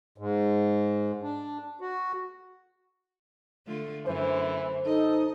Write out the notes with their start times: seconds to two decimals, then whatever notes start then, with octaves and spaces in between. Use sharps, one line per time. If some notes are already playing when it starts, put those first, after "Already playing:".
0.18 G#2
1.22 D4
1.81 F#4
3.67 D3 A3 F4
4.06 F#2 D3 E3 C5
4.86 D#4 A4 D#5